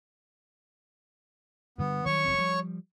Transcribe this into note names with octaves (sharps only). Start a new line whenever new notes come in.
G2 D3 G3 B3
D#3 F#3 G3 C#5 C#6
F#1 F3 C4
F3 G3